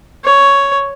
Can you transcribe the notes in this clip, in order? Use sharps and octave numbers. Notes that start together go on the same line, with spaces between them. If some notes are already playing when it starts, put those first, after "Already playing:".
C#5